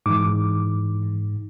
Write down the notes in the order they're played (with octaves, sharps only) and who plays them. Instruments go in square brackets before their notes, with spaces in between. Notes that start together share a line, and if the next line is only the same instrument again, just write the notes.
[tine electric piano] G#2 [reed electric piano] E3 D6